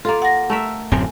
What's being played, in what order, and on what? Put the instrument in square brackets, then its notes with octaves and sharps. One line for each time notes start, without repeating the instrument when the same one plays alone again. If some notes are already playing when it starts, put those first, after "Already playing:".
[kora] A#3 F4 [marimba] A4
[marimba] F#5 A#6
[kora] A3 A#4 E5
[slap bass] D1 F#2 C4 [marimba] G#5